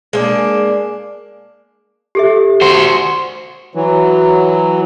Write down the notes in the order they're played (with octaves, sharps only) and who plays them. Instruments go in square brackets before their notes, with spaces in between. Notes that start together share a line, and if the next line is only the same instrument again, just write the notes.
[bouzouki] G#3 A#3 D4
[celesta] G4 A4 E5
[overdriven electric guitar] F#4 C5
[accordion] E3 F#3